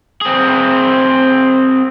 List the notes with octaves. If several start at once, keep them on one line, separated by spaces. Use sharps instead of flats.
C4 G#4